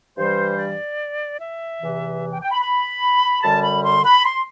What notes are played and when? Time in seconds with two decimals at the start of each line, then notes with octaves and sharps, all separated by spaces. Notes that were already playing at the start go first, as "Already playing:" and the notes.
0.17 G2 E3 G3 C5
0.57 D5
1.40 E5
1.80 E2 C3 E3
2.31 G5
2.41 G5
2.51 B5
2.61 B5
3.42 F#2 D3 G3 A5
3.63 B5
3.84 C6
4.04 B5
4.24 C6